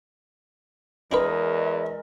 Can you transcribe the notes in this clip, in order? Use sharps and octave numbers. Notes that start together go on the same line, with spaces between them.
E2 G#3 D4 D#4 A#4 B4 D#5